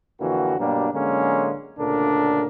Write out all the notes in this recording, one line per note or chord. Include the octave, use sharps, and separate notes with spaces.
F2 D3 E3 A#3 F#4
G2 B2 F#3 G3 A#3 D4
A1 D3 F#3 G#3 A#3 C#4
D2 A#2 C#3 D4 A4 A#4